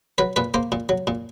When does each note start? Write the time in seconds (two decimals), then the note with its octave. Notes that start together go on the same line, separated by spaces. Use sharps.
0.18 F#3 B4
0.36 A#2 B4
0.54 A#3 C5
0.72 A#2
0.89 F#3
1.07 A#2